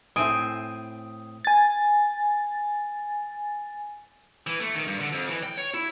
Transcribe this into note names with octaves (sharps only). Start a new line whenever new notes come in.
A2 C4 G#5 D#6 D7
G#5 A6
E3
A3
D#3
G2
D3
F2
E3
G5
C#5
E4